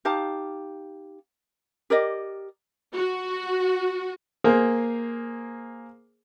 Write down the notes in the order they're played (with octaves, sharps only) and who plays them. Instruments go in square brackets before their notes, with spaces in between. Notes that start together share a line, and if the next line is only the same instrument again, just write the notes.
[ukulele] D#4 G4 F5 A5
G4 A#4 D5 D#5
[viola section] F#4
[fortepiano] A#3 G#4 A#4 C5